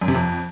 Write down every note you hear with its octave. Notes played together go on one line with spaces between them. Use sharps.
F#2
C3
F2